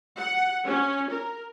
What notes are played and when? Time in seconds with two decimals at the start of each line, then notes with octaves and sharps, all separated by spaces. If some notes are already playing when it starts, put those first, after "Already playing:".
0.17 F#5
0.66 C#4
1.11 A#4